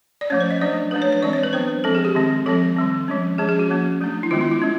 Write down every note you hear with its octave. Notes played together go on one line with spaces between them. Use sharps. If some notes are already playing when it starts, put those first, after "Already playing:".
D5
F3 A3 C#4 C#5
C5
D#5
F#3 A3 D4 D5
F#3 A3 D4 B4
C#5
C#5
E3 G#3 C4 D5
C#5
B4
F#3 B3 D4 C5
F3 G#3 C4 A4
G#4
G4
D#3 G#3 C4
F3 G#3 C4 A4
D#3 G3 C4
F3 G#3 C#4
F3 G#3 C#4 G#4
G#4
F#4
F3 A#3 C#4
F#3 A3 D4
E4
D#3 G#3 B3 F4
E4
F4
G#3 C#4